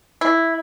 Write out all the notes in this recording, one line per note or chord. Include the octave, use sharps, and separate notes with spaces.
E4